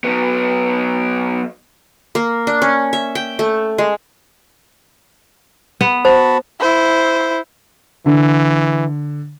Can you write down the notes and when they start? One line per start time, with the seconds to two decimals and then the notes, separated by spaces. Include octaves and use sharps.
0.04 F#3 B3
2.15 A#3
2.47 D4
2.62 C#4
2.93 E5
3.15 G5
3.39 A3
3.78 G#3
5.81 B3
6.05 F#4 C5 A5 B5
6.60 E4 C5
8.06 D3 E3